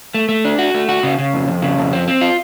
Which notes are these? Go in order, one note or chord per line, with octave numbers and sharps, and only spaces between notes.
A3
A3
D4
F#4
A3
F#4
C#3
C#3
F2
F2
C#3
F2
C4
C4
F4